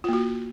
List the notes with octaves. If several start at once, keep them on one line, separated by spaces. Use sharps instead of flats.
A#3 F4 F#4